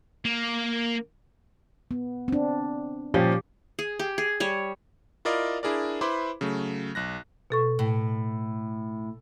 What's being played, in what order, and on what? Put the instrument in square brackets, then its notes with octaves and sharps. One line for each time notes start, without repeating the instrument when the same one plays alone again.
[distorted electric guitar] A#3
[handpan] B3
C4 D4
[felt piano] A#2 F3 C#4 [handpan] G4
[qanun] G#4
G4
G#4
G3 C#5
[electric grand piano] E4 F4 A#4 D5 D#5 F5
D4 E4 G#4 A#4 D5
E4 B4 C5 B5 C6 D6
C#3 F#3 A3
B1 F#6 A#6
[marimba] B2 A4 C#6
[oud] A2